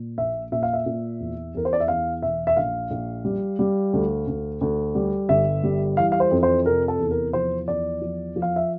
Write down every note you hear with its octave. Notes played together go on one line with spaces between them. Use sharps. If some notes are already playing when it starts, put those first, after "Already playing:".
Already playing: A#2
A#1 E5
A#2 E5
F5
E5
A#2
E2
E2 A#4
C5
D5
E5
E2 F5
E1 E5
E5
A#1 F5
A#1
G3
G3
D2
D2
D2
G3
G1 E5
G3
E3 F5
F5
C5
F2
C5
C3 A#4
A4
E2
A#4
F3 C5
E2 D5
F3
F3
F5
E5